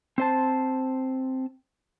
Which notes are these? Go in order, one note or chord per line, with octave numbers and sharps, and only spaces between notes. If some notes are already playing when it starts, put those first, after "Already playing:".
C4 C5 A5